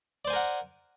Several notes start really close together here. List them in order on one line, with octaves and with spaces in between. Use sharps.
D5 C5 G#5 A#4 F#5